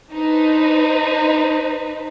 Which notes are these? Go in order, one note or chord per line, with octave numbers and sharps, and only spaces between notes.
D4 D#4 B4 C5